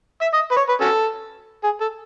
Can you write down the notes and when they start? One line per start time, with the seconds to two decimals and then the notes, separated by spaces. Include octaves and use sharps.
0.21 E5
0.34 D#5
0.51 B4
0.57 C#5
0.69 B4
0.81 C#4 F#4 A4
1.64 G#4
1.81 A4